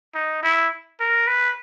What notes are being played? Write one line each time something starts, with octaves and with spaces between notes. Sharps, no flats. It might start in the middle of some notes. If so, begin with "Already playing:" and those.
D#4
E4
A#4
B4